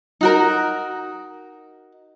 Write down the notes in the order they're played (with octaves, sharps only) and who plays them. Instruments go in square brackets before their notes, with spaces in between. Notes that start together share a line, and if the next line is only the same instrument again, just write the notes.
[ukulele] D#4 F#4 A#4